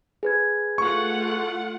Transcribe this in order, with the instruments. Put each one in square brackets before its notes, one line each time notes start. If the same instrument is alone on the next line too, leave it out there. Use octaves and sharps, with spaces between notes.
[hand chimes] G#4 B4 G#6
[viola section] A3 F4 F#5 [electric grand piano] C#6